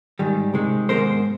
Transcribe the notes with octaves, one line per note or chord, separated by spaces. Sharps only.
G#2 D#3 G3
C3 D#3 G#3
G#2 F3 G#3 B3 A#4 C5